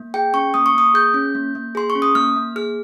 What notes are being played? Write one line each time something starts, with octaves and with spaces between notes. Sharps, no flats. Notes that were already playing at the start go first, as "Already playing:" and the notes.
Already playing: A#3
G#4 G5
C#4 C#6
A#3 D#6
C#6
A#3 D#6
G#4 G6
C#4
A#3
A#3
G#4 C6
C#6
C#4
D#6
A#3 F6
A#3
G#4 F6